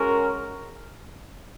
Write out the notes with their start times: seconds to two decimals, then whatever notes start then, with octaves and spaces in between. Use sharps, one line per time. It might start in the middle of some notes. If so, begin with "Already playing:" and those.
Already playing: G#3 C#4 F#4 A#4